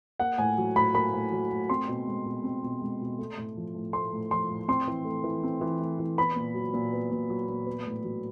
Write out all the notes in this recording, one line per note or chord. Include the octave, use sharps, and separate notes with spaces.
A#3 F#5
A2 G#5
F#3
A2 B5
A#3 B5
A2
F#3
A2
C4 C6
B2
G#3
B2
C4
B2
G#3
B2
A3
A2
F3
A2
A3 C6
A2
F3 C6
A2
C4 C6
E3
A3
E3
C4
E3
A3
E3
B3 B5
A#2
F#3
A#2
B3
A#2
F#3
A#2
B3
A2
F#3